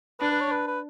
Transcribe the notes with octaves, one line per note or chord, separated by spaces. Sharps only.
D4 B4
B4
C#5
B4
B4